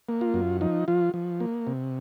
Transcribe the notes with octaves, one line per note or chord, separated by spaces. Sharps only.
A#3
F4
F#2
F3 D#4
F3 F4
F3
A#3
C3